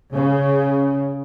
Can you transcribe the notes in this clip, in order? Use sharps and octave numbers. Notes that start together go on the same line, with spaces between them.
C#3